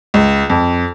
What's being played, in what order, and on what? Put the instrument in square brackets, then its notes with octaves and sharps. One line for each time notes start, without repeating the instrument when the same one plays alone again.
[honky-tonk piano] C#2
F2